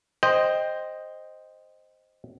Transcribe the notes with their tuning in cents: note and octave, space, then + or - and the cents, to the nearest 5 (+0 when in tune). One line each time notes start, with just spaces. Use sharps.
C5 +0 D#5 +0 G5 +5